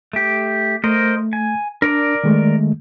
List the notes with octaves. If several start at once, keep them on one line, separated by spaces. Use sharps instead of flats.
A3 G4
A3 A#4 C5 D#5
G#5
D4 A#4 D5 A#5
D#3 G#3 A3